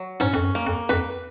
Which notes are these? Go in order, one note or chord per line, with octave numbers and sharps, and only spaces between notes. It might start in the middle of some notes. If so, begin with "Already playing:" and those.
Already playing: F#3
G#2 C#4
F2
F#2
A#3
F2
F2 B4